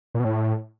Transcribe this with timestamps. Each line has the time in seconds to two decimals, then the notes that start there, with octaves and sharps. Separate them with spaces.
0.15 A#2
0.20 B2
0.25 A2